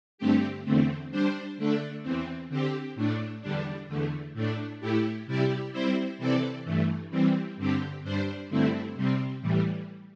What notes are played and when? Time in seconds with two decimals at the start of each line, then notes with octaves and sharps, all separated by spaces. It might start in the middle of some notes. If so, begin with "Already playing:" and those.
0.18 G2 D3 A3 C4 G4
0.65 E2 D3 A3 C4
1.11 G3 D4 C5
1.58 D3 A3 D4 A4
2.03 E2 E3 C4
2.49 D3 C4 G4
2.95 A2 A3 D4
3.42 E2 D3 G3 D4
3.88 E2 D3 A3
4.34 A2 A3 D4
4.80 A2 A3 E4 G4
5.26 C3 G3 E4 G4 D5
5.72 G3 C4 E4 C5
6.18 C3 E3 C4 A4 D5
6.65 G2 E3 A3
7.11 E3 G3 C4
7.57 G2 D3 C4 G4
8.03 G2 G3 D4 C5
8.49 G2 D3 A3 C4 E4
8.95 C3 G3 C4
9.41 A2 E3 G3